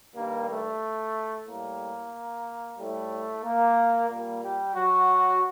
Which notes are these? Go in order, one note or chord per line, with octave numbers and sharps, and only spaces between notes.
G2 D#3 G3 A#3
A3
A2 G3 A#3
A2 G3 A3
A#3
A#2 G3 A#3
G3 G4
F#3 F#4